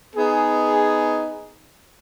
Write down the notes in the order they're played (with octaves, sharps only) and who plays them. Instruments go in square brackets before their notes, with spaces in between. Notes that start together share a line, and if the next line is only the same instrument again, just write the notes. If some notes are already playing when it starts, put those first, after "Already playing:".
[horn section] B3 D#4 G#4